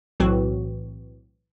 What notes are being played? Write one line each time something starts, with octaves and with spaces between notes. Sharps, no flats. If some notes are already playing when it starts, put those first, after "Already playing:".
B1 A2 E3 F#3 C4 F#4